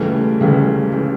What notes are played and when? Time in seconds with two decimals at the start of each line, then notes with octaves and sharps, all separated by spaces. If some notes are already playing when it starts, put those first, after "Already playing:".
Already playing: C#2 C#3 E3 G3 A3
0.40 C#2 C#3 E3 G3
0.92 C#3 E3 G3